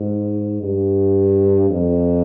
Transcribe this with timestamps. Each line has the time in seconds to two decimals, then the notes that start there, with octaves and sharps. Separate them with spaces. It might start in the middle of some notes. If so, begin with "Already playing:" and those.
Already playing: G#2
0.63 G2
1.70 F2